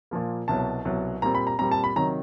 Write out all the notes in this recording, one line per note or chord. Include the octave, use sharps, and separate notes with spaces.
A#2 F3 A#3
C2 B2 F#3 A5
C2 B2 F#3
A#2 G3 C4 A#5
B5
A#5
A#2 G3 C4 A#5
A5
B5
C3 D#3 F#3 A#5